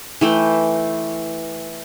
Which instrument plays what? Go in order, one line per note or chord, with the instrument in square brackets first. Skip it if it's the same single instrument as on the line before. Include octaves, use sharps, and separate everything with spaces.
[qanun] E3 A3 G5